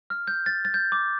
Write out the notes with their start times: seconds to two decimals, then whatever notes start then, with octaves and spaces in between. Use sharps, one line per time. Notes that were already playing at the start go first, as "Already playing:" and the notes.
0.10 F6
0.27 G6
0.46 A6
0.65 A6
0.74 G6
0.92 D6